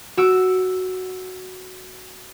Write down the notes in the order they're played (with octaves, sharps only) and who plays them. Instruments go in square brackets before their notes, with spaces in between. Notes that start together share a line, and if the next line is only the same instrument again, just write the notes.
[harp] F#4 E6 D7